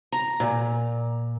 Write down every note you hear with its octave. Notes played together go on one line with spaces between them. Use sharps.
A#5
A#2